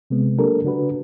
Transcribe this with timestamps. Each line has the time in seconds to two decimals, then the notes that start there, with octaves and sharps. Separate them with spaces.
0.10 C3 G#3 B3 C4
0.38 F#3 A#3 D4 G4 A4 A#4
0.64 C#3 D4 F#4 B4